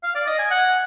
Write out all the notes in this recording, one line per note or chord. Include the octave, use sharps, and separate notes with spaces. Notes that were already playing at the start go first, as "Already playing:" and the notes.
F5
D5
D#5
G#5
F#5